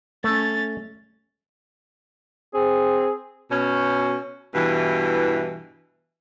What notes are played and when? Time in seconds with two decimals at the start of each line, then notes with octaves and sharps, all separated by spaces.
0.24 A3 C#4 A6
2.54 C4 G#4
3.51 B2 C#4
4.55 G2 B2 E3